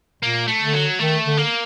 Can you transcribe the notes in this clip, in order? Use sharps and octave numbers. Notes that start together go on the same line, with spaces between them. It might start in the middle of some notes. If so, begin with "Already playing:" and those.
A#2 A#3
A3
D3
F#3
D#3 A3
D3
A#3